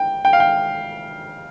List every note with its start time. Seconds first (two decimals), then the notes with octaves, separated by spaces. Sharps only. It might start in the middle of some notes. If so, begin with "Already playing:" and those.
Already playing: G5
0.25 G5
0.33 F5
0.40 G5